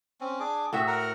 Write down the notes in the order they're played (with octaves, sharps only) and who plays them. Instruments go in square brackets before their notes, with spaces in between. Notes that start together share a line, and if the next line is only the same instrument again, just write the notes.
[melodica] C4 C#4
D4 G#4 D6
[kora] A2 F#4 E5 [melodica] G#4
[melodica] A#4 F#5 A#5